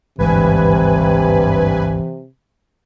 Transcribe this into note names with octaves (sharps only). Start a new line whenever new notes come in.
G#1 D2 G2 C3 E3 G#3 B4 G#5